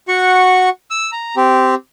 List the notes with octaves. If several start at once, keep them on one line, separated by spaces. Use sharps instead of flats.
F#4 F#5 C#6
E6
A#5
C4 G4